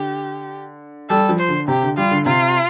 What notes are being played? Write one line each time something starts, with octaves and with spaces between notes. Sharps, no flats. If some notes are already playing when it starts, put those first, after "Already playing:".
Already playing: D3 G4
G3 A4
F3
C5
D3
C3 G4
D3
G3 F4
D3
C3 F4